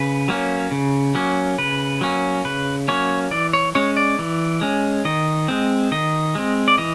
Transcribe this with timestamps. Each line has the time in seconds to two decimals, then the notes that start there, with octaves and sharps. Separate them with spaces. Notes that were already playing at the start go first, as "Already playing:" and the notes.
Already playing: C#3 B4
0.28 F#3 A#3 C#4
0.71 C#3
1.15 F#3 A#3 C#4
1.58 C#3 B4
2.01 F#3 A#3 C#4
2.45 C#3 B4
2.88 F#3 A#3 C#4 C#5
3.31 E3 D5
3.53 C#5
3.75 G#3 C#4 C#5
3.97 D5
4.19 E3
4.61 G#3 C#4
5.05 D#3 D#5
5.48 G#3 C4
5.91 D#3 D#5
6.35 G#3 C4
6.68 D5
6.78 E3 D#5